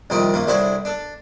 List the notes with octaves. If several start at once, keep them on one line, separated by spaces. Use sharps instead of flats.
C2 F2 D#3 C4 D#4 G4
F#2 C3 A#3
C2 D3 G3 E4 C5 C#5
D4 A4